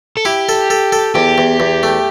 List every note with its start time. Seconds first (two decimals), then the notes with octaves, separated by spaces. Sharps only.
0.17 A4
0.25 E4 G4
0.49 A4
0.70 A4
0.92 A4
1.15 E2 G4
1.38 E2
1.60 E2
1.83 A3